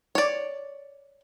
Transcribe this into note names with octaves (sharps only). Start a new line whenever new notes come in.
C#5 D5